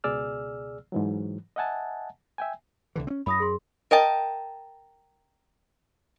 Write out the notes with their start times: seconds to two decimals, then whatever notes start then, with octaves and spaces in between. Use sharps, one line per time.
0.04 C#2 B2 G#4 D5 E6 F6
0.92 G#2 E3 F#3
1.56 D#5 E5 F#5 G#5 A5
2.38 E5 G5 G#5
2.96 C2 D3 E3
3.07 C4 C#4
3.26 F#2 B5 D#6 A#6
3.40 G#4 C6
3.91 A#4 D#5 G5 A5